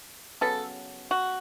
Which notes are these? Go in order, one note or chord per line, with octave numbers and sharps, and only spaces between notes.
C#3 F#3 B3 A4
F#4